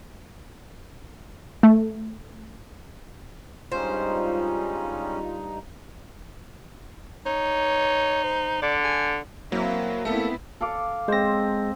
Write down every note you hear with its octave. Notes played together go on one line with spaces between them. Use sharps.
A3
G2 G3 G#3 C#4 D#4 F4 C5
D#4 C#5
C5
D3 D5
G#5
F#3 A#3 C4 E4
A3 B3 C4 E4 A4
A4 F5 D6
G#3 C4 C5 A#6